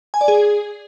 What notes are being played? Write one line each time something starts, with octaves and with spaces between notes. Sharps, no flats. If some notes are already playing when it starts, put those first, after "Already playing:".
G#5
D5
G#4